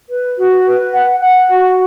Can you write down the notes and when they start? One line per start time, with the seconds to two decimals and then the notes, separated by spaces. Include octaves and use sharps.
0.09 B4
0.37 F#4
0.65 B4
0.93 F#5
1.20 F#5
1.48 F#4